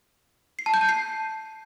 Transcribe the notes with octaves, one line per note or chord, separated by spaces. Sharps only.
C7
A5
G6
A5
C7